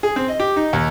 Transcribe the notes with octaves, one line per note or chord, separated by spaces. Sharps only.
G#4
C4
D#5
G4
D#4
D#2